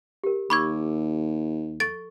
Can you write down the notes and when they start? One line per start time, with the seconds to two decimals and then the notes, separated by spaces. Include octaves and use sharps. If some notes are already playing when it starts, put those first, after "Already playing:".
0.23 G4 A#4
0.50 D#2 B5 C#6 D6 E6 G#6
1.80 A4 C#6 A6 D7